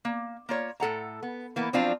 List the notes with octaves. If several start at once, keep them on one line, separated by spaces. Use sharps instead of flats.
A#3
A#3 F4 C#5
A2 A4 F#5 A#5
B3
E3 A#3 B3
F3 F#3 C4 D4 F4